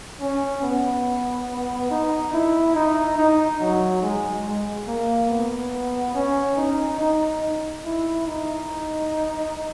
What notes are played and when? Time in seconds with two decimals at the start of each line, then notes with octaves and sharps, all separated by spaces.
0.21 C#4
0.63 B3
1.90 D#4
2.33 E4
2.75 D#4
3.18 D#4
3.60 F#3
4.02 G#3
4.87 A#3
5.30 B3
6.15 C#4
6.57 D#4
7.00 D#4
7.85 E4
8.27 D#4